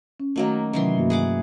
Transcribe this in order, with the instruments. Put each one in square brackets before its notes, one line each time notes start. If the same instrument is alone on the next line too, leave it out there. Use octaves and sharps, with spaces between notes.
[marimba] C#4
[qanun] D#3 F#3 A#3 [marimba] A3 D#5
[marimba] C3 F#3 C#4 [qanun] D#3 E3 C6
[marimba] G2 A#3 F#4
[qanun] G#4 F#5 D6